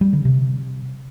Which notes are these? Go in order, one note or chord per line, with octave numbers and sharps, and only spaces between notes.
G3
D3
C3